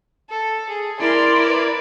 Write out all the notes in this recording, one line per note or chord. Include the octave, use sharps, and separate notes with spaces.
A4
G#4
E4 A#4 D5 C6
B4